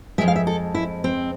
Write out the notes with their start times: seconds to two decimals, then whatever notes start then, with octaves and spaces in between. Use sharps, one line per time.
0.18 F2 E3 G#3 E5
0.28 F5
0.36 E5
0.47 A4
0.75 E4
1.04 C4